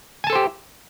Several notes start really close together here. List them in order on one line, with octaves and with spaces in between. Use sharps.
G#5 A5 A4 C5 G4